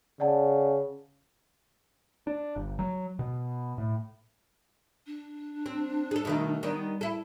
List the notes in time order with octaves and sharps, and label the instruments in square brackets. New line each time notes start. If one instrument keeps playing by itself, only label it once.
[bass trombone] C#3 [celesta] D5 F#5 A5
[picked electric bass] D4
G1
F#3
B2
A2
[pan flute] D4
[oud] C4
G#4 A4
B2 D#3 A3
D#3 G3 B3
E4 A4